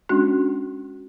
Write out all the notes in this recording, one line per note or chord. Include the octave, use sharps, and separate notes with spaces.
G#3 C#4 D4 F#4 F#6